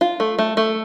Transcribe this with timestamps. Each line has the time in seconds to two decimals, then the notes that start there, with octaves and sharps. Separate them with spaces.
0.01 F4
0.20 A3
0.39 A3
0.57 A3